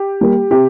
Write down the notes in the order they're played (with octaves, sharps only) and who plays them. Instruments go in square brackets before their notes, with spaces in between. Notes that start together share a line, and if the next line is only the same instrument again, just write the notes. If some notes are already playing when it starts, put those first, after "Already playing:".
Already playing: [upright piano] G4
G3 A#3
C3 G4